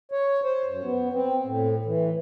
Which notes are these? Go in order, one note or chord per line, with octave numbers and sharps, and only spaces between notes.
C#5
C5
F#2
B3
C4
A2
E3